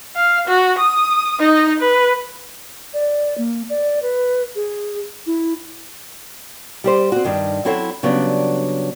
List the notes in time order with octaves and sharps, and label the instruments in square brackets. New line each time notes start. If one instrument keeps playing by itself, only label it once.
[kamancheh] F5
F#4
D#6
D#4 D#5
B4
[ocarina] D5
A#3
D5
B4
G#4
E4
[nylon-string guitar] G3 G4 C5
C4 F#4
G2 D#3
F#3 C4 E4 A4 C#5 F#5
C#3 F#3 G3 B3 D4